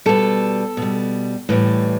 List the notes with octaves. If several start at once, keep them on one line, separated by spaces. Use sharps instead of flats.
B2 G3 A4
B2 G3
A2 E3 G3